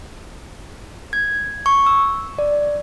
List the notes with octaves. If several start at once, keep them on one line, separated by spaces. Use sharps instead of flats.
G#6
C#6
E6
D5